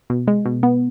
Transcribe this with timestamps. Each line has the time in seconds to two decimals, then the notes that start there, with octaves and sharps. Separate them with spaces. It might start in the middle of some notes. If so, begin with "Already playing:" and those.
0.10 B2
0.28 G#3
0.46 B2
0.63 B3